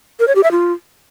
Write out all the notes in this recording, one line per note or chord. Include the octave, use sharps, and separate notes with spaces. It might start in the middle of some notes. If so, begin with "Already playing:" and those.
A#4
C#5
G4
E5
F4